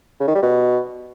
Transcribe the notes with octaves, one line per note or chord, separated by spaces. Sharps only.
C#3
D#3
G3
B2